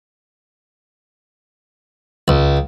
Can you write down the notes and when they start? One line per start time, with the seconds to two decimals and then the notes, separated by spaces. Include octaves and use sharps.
2.28 C#2